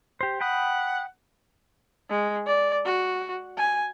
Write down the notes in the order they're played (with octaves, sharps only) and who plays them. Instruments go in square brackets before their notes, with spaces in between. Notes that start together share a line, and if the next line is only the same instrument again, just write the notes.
[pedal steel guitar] G4 C5
[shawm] F#5 [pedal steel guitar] G5 B5 D#6
[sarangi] G#3
D5
F#4
G#5